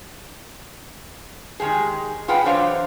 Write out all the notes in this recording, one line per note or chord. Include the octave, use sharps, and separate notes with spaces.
D#3 G#3 G4 G#4
F4 G#4 B4 F#5 G5
E3 F#3 D4 C5 C#5 F5